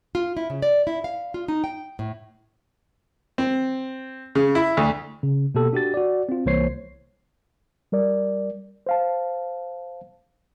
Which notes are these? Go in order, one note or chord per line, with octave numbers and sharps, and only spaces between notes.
F4
E4
C#3
D5
E4
F5
F4
D#4
G5
A2
C4
C#3
E4
D2
C#3
B2 A#3 G4 A4
D4 F#4 G4 A6
F#4 D5
C4 F4
C2 E3 A#3 C5 C#5 C7
G3 A#4 D5
C5 F5 A5